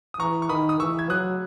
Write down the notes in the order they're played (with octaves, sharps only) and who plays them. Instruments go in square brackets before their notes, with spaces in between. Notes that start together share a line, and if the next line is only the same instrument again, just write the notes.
[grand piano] D#6
[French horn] E3 [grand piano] A#5 C#6
[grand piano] C#6
[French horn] D#3 [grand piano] B5 D#6
[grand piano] D#6
[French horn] E3 [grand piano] C#6 E6
[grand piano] G#6
[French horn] F#3 [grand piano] D#6 F#6